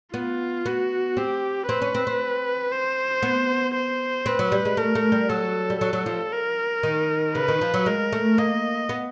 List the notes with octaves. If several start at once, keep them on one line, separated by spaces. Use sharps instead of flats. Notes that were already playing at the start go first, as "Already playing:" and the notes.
B3 F4
B3 F#4
C4 G4
C4 B4
C#4
C4
C4
C5
B3
C5
C4 B4
F#3
G3
G#3
A3 A#4
A3
G3
F#3 A4
G3
F#3 A4
F#3
F3
A#4
D#3
C#3 B4
D#3
F3
F#3
G#3 A#4
A3
A#3 D#5
B3